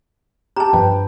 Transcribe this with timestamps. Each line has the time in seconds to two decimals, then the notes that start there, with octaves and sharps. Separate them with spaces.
0.56 G4 A5 A#5
0.73 G2 F3 B4 G5